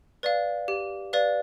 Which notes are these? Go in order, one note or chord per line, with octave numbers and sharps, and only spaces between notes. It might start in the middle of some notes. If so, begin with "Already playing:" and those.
B4 D5 F5
G4
B4 D5 F5